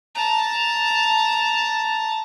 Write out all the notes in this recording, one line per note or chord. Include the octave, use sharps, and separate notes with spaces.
A5 A#5